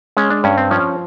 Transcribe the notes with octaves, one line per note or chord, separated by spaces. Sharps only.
G#3 C#4
D4
G2 C#4
C4
F3 C#4